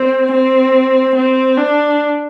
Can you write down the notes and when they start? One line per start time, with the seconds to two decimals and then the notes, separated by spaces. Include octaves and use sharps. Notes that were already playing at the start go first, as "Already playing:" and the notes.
Already playing: C4
0.33 C4
1.16 C4
1.57 D4